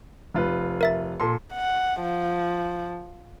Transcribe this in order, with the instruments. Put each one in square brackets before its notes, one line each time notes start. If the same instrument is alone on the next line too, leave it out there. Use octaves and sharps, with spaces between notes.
[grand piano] F1 F4 B4
[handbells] A#4 E5 A6
[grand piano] A#2 A4 C6
[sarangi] F#5
F3